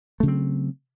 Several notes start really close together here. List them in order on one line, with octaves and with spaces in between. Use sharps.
A3 C#3 F#3 C4